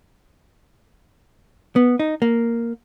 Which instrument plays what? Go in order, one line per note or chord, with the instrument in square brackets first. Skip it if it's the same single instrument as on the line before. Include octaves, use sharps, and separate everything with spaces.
[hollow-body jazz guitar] B3
D#4
A#3